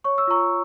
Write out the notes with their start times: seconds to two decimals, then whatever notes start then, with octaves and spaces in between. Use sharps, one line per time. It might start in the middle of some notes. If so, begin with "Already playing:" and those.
0.04 C#5 C#6
0.18 E6
0.28 F4 A#5 C#6